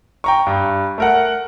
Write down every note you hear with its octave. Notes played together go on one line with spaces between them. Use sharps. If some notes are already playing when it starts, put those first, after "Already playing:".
G5 A#5 C#6
G2
A3 A#4 F#5